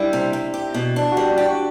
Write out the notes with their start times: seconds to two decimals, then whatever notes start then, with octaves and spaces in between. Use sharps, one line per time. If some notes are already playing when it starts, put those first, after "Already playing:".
Already playing: G3 D4 E4
0.13 C3
0.33 C3
0.54 G4
0.74 B2
0.96 D4
1.11 F#4
1.17 G3 G4
1.33 D4 G4
1.48 F#4